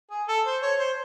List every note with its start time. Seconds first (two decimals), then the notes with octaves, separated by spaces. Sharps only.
0.11 G#4
0.28 A4
0.46 C5
0.62 C#5
0.79 C5